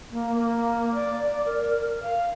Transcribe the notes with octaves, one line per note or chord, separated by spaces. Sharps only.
A#3
A#3
D5
A#4
A#4
F5